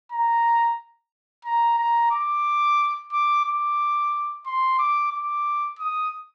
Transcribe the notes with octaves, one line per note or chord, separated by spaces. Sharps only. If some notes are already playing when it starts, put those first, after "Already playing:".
A#5
A#5
A#5
D6
D6
D6
C6
D6
D6
D#6